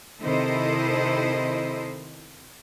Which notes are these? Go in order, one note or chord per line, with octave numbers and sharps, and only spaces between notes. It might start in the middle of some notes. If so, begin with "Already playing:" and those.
C3 D#3 E4 A4 C5 D#5